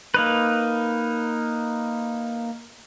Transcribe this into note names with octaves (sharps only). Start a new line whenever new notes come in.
A#3 D#4 B4